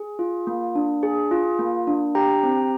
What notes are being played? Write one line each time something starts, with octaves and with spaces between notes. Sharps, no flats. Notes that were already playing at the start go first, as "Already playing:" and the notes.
Already playing: G#4
F4
A#3
D4
G#4
F4
A#3
D4
G4 G5 A#5
C4